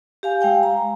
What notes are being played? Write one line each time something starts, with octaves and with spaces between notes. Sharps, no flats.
G4 F5 G#5
G#3 F5 G5 G#5
A#5